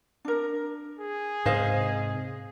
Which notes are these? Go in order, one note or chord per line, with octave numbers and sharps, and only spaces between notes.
D4 A#4
G#4
G#2 C3 C5 D#5 F5